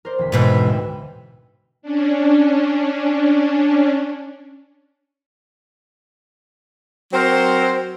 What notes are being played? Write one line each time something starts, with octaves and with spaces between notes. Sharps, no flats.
A#4 C5 D5
E1 D2 B6
G#2 B2 E3
D2 E5 G5
C#4 D4
F#3 C4 A#4 C5